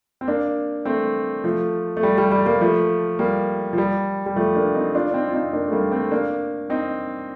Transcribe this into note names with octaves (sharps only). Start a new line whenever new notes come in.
C4
A#3 D4
A3 C4
F3 A3
A3
G3
G3
G3
G3 A#3
F3 A3
G3 A#3
F3
G3
G3
F3 A3
A#3 D4
C4 D#4
D4 F4
D4
C4 D#4
F4
C4 D#4
A#3 D4
A3
G3 A#3
A3 C4
A#3 D4
C4 D#4